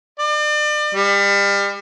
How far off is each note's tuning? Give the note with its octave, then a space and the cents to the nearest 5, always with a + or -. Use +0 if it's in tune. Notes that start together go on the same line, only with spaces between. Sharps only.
D5 +35
G3 +35